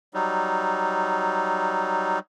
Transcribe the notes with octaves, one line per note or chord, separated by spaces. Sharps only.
F#3 G3 D#4